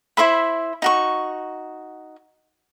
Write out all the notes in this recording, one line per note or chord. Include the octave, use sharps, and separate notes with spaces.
E4 C5 E5 B5
D#4 F#4 C#6